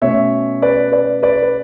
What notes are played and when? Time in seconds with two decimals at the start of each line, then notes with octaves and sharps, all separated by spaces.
0.01 B2 A3 C#4 C#5 E5
0.62 B4 D5
0.92 B4 D5
1.23 B4 D5
1.42 B4